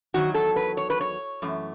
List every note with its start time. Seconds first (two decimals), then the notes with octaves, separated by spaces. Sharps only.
0.14 E2 D#3 F#3 F#4
0.34 A4
0.56 B4
0.77 C#5
0.90 B4
1.01 C#5
1.42 F#2 E3 A3